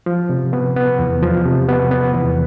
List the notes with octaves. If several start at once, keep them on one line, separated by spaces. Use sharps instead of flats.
F3
C3
B3
B3
E2
F3
C3
B3
B3
E2